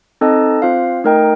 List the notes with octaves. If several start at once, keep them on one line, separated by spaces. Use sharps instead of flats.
C4 D#4 A4 D#5 A5
C4 F4 C5 F5
A3 D#4 A#4 D#5 G5